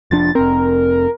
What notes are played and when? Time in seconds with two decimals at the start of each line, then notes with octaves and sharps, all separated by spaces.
0.11 F1 F3 D4 A6
0.35 F1 C4 A#4